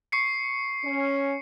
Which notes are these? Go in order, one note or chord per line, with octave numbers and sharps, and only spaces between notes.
C#6 C7 C#7
C#4